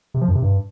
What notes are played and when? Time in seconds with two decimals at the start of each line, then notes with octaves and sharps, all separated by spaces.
0.14 C3
0.21 F3
0.28 F#2
0.35 C3
0.42 G2